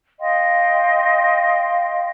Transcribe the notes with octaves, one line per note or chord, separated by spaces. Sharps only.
D#5 F5 G5 C6